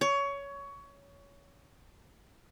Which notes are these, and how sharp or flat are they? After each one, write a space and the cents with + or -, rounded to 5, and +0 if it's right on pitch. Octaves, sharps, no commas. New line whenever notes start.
C#5 +20